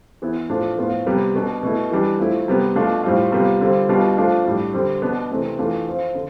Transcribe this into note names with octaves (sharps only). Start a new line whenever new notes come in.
E3 B3 E4
A2 F3 A3 D4 F4
A2 F3 B3 F4
C3 G3 B3
B2 B3 D4
B2 A3 E4
E3 G3 D4
F3 A3 E4
C3 G3 B3
B2 A3 D4 F4
A2 G3 C4 F4
C3 G3 B3 F4
D3 G3 C4 F4
B2 G3 D4 F4
F3 A3 D4 F4
A2 G3 D4
D3 G3 C4
B2 B3 D4
C3 E3 A3 C4
E3 A3 D4 F4
F3 C4 F4
D3